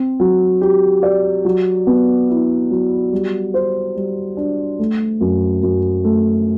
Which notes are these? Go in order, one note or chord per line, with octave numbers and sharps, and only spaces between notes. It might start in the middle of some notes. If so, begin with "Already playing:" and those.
Already playing: C4
F#3
G4
D5
F#3
B3
E4
F#3
G3
C5
G3
D4
A3
F#2
F#2
A3